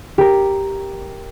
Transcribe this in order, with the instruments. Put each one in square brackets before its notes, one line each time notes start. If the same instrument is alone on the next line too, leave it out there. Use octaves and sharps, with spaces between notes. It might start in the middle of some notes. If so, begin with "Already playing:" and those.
[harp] G4 A#4